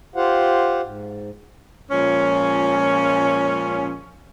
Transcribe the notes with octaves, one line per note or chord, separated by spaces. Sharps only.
F4 G4 C5 F5 F#5
G#2
A#2 F3 G#3 C#4